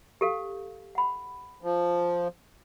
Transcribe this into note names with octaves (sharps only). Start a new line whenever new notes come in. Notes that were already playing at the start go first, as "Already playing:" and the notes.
G4 A4 F5
F#5 B5
F3